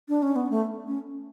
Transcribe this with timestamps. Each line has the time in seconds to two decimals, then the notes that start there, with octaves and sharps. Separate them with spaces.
0.09 D4
0.22 C#4
0.36 B3
0.51 A3
0.87 C#4